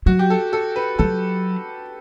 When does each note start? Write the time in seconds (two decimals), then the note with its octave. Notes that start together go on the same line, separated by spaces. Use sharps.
0.06 F#3 F#4
0.19 G4
0.30 A4
0.53 A4
0.76 B4
0.99 F#3 A4